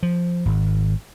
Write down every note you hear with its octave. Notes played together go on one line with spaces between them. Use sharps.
F3
G#1